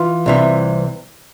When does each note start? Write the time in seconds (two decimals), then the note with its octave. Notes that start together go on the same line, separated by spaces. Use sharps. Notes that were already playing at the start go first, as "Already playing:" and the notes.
Already playing: E3 F4
0.26 C2 C3 E3